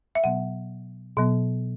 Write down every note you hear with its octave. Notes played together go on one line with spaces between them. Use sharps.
E5
B2 F#3 B3 F#5
B2 F#3 B3